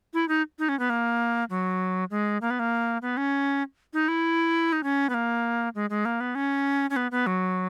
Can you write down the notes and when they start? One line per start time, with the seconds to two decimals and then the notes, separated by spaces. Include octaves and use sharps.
0.14 E4
0.29 D#4
0.59 D#4
0.69 C#4
0.79 B3
0.90 A#3
1.50 F#3
2.11 G#3
2.41 A#3
2.50 B3
2.59 A#3
3.02 B3
3.17 C#4
3.93 D#4
4.08 E4
4.72 D#4
4.83 C#4
5.09 B3
5.14 A#3
5.75 G#3
5.90 G#3
6.05 A#3
6.20 B3
6.35 C#4
6.90 C#4
6.96 B3
7.11 B3
7.27 F#3